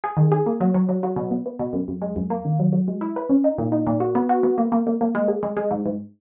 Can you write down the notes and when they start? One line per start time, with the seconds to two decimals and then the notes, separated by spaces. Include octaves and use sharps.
0.04 G#4
0.17 D#3
0.32 G#4
0.46 A#3
0.61 F#3
0.74 F#3
0.89 F#3
1.03 F#3
1.16 B2
1.31 B3
1.46 B3
1.59 B2
1.73 F#2
1.88 F#2
2.02 G#3
2.16 F#2
2.30 A#3
2.45 D#3
2.59 F#3
2.73 F#3
2.88 G#3
3.01 E4
3.16 B4
3.29 C#4
3.44 D#4
3.58 A#2
3.72 D#4
3.87 A#2
4.00 F#4
4.15 B3
4.29 F#4
4.43 B3
4.58 A#3
4.72 A#3
4.87 A#3
5.01 A#3
5.15 G#3
5.28 G#4
5.43 G#3
5.57 G#3
5.71 G#2
5.86 G#2